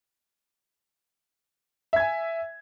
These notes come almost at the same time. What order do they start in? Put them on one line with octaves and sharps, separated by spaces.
E5 G#6 G#5